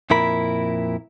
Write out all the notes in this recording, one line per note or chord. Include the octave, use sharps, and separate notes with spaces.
F2 A#2 E4 A#4 B5